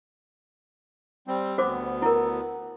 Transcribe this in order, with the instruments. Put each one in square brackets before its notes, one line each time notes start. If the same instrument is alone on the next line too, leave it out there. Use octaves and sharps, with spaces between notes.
[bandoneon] G3 C4
[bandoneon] D2 B3 [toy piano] F#4 C5 D6
[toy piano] E4 A#4